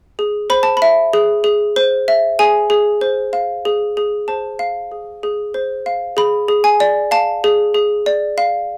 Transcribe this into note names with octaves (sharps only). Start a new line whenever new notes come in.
G#4
C5 B5
A5
B5
E5
G#4
G#4
C5
E5
G#4 G#5
G#4
C5
F5
G#4
G#4
C5 A5
F5
G#4
G#4
C5
F5
G#4 B5
G#4
G#5
D5
F5 A5
G#4
G#4
D5
F5